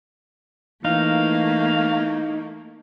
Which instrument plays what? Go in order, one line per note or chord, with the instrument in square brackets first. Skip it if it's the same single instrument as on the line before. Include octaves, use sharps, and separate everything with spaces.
[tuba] E3 [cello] A3 A#3 [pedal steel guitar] D#4 [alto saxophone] F5